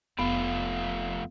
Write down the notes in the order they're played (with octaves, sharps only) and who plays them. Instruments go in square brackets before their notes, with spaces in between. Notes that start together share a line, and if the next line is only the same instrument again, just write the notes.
[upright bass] F1 [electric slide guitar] F2 A3 F4 [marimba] B3